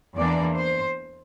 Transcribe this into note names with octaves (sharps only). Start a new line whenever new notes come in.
E2 E3 A#3 D4 D5
C5